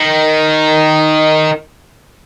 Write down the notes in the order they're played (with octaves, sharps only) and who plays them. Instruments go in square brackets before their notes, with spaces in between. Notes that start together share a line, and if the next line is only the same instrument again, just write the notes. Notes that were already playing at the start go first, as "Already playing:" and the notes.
Already playing: [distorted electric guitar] D#3